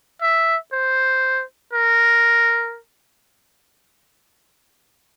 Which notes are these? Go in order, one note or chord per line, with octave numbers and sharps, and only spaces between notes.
E5
C5
A#4